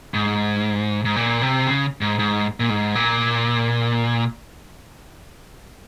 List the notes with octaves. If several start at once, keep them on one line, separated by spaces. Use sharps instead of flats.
G#2
G#2
A#2
C3
C#3
G#2
G#2
A#2
G#2
A#2